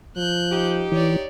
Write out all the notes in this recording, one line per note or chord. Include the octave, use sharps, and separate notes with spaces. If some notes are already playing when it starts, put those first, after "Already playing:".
F3 F#6 G6
D#4 G4
E3 C#5 D5